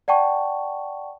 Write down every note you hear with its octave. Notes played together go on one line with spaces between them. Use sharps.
D5 F#5 G5 A5 C#6